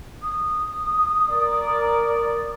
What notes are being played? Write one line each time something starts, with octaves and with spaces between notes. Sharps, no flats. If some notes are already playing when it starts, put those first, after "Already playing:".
D#6
A#4 D5